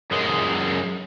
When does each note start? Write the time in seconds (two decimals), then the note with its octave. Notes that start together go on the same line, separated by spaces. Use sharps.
0.11 F#2 G#3